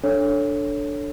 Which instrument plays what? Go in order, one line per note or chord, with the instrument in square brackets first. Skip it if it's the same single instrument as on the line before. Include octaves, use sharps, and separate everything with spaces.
[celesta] D4 A4 C#5